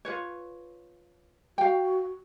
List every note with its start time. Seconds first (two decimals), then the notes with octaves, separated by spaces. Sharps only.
0.05 F4 B4 C#5
1.58 F#4 F5 G5